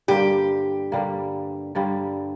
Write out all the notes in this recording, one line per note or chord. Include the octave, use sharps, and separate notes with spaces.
G2 D3 G3 A#3 G4
G2 D3 G3 A#3
G2 D3 G3 A#3